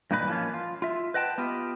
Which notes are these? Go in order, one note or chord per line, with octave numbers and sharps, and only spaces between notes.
G2 A#2 E3 D#4 F#4 B4
F3 A3 A#3 C#4 F4
F4
F4 E5
B4 D#5 F#5 G5 A5
B3 F4 G4